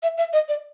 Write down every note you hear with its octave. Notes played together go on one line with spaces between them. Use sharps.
E5
E5
D#5
D5